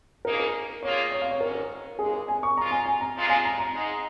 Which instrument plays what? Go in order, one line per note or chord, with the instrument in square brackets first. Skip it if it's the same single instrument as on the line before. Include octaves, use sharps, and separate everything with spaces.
[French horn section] C#3 A#3 D#4 G#4 [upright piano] A#4
[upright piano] A#4
[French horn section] D#3 A#3 F4 G#4 [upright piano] C#5
[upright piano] C#5
F5
C#5
[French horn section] G#2 D#3 C#4 [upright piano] A#4
[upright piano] A#4
[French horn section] D#2 C#3 G#3 D#4 [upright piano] G#4
[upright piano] A#4
G#5
C#6
[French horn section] C#3 F3 G#3 F4 [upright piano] A#5
[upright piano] G#5
G#5
A#5
[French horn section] A#2 F3 G#3 F4
[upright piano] G#5
A#5
A#5
[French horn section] G#2 G#3 D#4